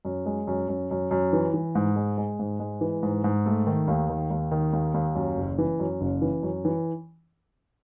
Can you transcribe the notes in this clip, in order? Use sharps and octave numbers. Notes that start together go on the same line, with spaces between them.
F#2
G#3
F#2
F#2
F#2
F#2
E3
E3
G#2
G#3
G#3
G#2
G#3
E3
G#2
G#2
A3
D#3
D#2
D#3
D#2
D#3
D#2
D#2
F#2
F#1
E3
F#2
F#1
E3
F#2
E3